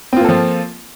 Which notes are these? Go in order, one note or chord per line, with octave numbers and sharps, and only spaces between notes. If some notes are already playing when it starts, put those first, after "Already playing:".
F3 A#3 C4 F4 A4